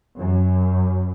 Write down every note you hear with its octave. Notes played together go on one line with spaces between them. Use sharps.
F#2